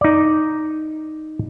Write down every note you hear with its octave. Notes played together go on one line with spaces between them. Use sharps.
D#4 D5